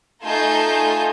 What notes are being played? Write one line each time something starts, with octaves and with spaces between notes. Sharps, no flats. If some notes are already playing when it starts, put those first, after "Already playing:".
A3 D#4 F4 G#5 A5 G6